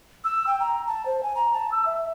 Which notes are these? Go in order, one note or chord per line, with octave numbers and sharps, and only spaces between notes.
E6
G5
A#5
A5
C5
G#5
A#5
A5
E6
E5